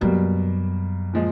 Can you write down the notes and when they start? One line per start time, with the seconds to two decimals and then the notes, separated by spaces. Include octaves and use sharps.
0.01 F#2 B2 G3 A#3
1.13 A#2 F3 G#3